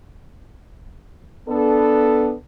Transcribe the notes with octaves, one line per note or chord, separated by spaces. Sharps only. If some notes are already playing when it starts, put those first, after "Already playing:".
B3 D4 A4